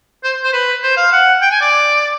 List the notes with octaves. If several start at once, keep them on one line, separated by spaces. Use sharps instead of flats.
C5
C5
B4
C5
F5
F#5
G5
G#5
D5